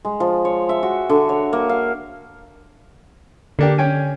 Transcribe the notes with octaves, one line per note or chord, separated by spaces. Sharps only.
G#3
F3
C#5
E5
F#4
D3
C#5
A#3
F5
D3 A#3 D4 G4
C#4 G5 G#5